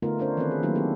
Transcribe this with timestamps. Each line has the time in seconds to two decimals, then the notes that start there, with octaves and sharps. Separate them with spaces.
0.02 D3 A3 B3 D#4 F4 A#4
0.18 C#4 D4 A#4 C5 C#5
0.37 D#3 E3 B3 C4 A4 B4
0.51 G#4
0.63 D#3 F#3 A3 A#3 D4 E4
0.75 C4 D4 G4 A4